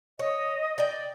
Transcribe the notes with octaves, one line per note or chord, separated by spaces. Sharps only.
C#5 D#5
D5 G5